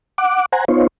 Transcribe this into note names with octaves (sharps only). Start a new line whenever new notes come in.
F#5 D6
C5 F#5 G#5 A#5
B3 D#4 F4 C5 C#5